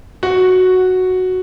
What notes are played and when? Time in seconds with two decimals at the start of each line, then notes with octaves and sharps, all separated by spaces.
0.23 F#4